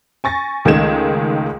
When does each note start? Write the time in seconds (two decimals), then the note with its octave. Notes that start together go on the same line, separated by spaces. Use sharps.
0.24 G#5 C#6 A6 A#6
0.65 C#2 D#3 G#3 A3 G#6 E7